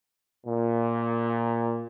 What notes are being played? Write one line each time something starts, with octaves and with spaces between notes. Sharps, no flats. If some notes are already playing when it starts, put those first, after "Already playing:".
A#2